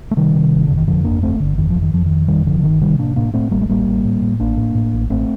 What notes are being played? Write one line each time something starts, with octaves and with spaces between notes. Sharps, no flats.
A3
C3 D#3 G3
C3
G1
F2 D3
D#3
F2 D3 F3
G1 A#3 D4
G1 A3 C4
G1 D3
F2 D#3
F3
F2
D#3
F2 F3
F2 D#3
G1 D#3 G3
G1 D3 F3
D3
G1 D#3
C3 D#3 G3
A2 A#3 D4
A2 A#3 D4
A2 A3 C4
A1 G3 A#3
A3
A1 G3 A#3
A1
A2
A2
A1 A#3 D4
A2
A2
A1
A1 A3 C4